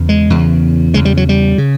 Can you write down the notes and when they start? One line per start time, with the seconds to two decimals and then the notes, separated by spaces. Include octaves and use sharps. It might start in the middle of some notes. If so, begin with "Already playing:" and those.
Already playing: E2 C#3
0.09 G#3
0.30 E2 C#3
0.94 E2 C#3 G#3
1.05 G3
1.17 F#3
1.29 G3
1.58 C#3